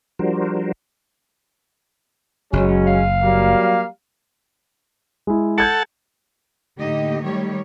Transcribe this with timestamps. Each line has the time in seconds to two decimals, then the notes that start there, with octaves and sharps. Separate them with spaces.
0.19 F3 G3 D4 F#4 A#4 C5
2.53 F#1 F#3 G#3 C#4
2.87 F5
3.23 F#3 G3 A#3
5.27 G#3 E4
5.58 A4 F#5 A5 G6 G#6 C#7
6.78 A2 D3 A#3 D#4 G4 D#5
7.24 D#3 F#3 G3 A3 G4 C#5